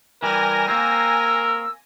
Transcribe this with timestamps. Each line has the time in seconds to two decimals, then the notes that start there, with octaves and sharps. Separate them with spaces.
0.23 E3 G3 A#4 G#5 A#6
0.68 A#3 C4 A#4 E6